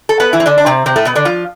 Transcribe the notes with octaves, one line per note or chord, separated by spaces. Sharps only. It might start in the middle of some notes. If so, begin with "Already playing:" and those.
A4
B3 B4
E3 E4
C4
D3 D4
D4
C3 C4
C3 C4
A2 A3
B2 B3
D3 D4
F3 F4